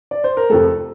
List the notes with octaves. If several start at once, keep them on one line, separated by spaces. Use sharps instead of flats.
D5
C5
A#4
F2 C3 F3 A3 A4